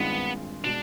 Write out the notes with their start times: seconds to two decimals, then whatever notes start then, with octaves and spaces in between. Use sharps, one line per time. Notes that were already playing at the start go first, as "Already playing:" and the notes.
Already playing: G2 D#3 G#3 B3 C4 F4
0.64 B2 G#3 D4